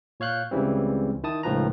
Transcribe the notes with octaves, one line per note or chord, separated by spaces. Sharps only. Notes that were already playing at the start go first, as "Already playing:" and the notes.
A#2 C#5 F5 F#6 G6
C#2 C#3 E3 G3 C4
D#3 E4 A5 D#6
C#2 A2 D#3 F3 B4 A#5